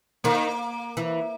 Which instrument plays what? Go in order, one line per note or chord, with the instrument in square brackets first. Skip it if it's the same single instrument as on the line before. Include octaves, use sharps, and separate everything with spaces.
[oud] D#3 [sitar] A#3
[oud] E3